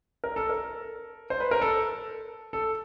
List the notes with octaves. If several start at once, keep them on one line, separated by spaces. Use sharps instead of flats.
A#4
A4
A#4
C5
B4
A#4
A4
A4